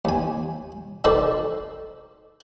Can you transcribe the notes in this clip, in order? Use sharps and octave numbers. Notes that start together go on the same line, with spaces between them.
D#2 G#5
D#4 F#4 A4 C5 D5